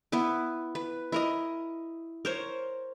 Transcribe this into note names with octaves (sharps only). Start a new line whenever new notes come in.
B3 E4 B4
B4
E4 A#4 D#5
A#4 C5 C#5